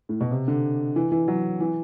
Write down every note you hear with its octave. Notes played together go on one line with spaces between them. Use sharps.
A2
B2
C3
D3
E3
E3
F#3
E3